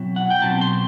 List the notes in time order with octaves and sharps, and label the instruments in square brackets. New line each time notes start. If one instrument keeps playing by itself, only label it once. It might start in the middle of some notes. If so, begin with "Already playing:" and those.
Already playing: [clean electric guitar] B2 F#3 C4 E4
F#5
G5
B2 F#3 C4 E4 A5
C6